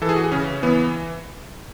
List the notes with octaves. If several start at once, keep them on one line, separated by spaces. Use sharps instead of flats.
E3 A4
G#4
F#4
G#4
C#3 C#4
E3 B3